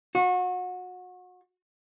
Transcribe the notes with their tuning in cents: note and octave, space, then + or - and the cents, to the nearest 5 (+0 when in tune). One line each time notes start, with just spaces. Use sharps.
F#4 -30